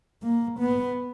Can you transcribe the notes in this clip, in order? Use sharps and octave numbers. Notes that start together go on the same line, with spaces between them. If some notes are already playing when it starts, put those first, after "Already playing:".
A#3
B3